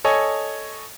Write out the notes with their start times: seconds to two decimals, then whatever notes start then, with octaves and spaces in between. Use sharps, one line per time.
0.05 A4 C#5 D#5 G#5